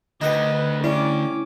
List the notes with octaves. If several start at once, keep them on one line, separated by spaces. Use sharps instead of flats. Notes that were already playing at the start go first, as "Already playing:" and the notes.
D2 D3 D#4 B4 D#5 F#5 G5
B4
G3 C#4 E4 D6